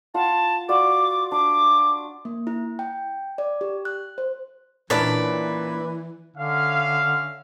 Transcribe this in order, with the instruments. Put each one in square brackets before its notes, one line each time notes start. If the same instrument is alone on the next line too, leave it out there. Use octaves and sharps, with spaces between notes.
[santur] F4 F#5 [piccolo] A5
[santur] F4 F#4 D5 [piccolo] D6
[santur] D4 [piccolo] D6
[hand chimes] A#3
E4
G5
D5
G4
F#6
C5
[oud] A#2 C#4 D4 [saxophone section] E3 [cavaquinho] B4 D5
[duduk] D3 [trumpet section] C#4 E5 F5